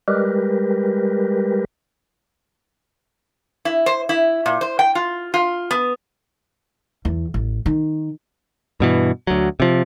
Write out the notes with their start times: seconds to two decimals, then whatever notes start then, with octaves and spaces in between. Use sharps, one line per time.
0.08 G3 G#3 G4 A#4 B4
3.65 E4
3.86 C5
4.09 E4
4.46 A#2
4.61 C5
4.79 G5
4.95 F4
5.34 F4
5.71 B3
7.05 E2
7.34 A1
7.66 D#3
8.80 G2 B2 E3
9.27 D2 F#3
9.60 C3 F3